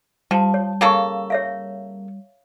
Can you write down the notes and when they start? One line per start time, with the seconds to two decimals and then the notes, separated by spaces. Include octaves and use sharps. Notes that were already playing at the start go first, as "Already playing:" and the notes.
0.31 F3 G3 G5 A5
0.54 C#5
0.81 C#3 A#3 A4 G5 C#6
1.30 C#5 E5 F5